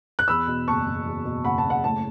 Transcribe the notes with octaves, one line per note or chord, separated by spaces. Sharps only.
F#6
E2 B5 E6
B2
F#1 A5 C#6
F#1
E2
B2
F#1 F#5 B5
A5
F#1
F#5
A2 A5